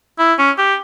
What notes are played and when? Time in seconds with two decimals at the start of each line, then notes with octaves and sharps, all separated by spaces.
0.19 E4
0.39 C#4
0.58 G4